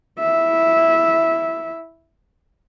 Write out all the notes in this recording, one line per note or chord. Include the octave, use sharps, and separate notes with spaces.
E4 E5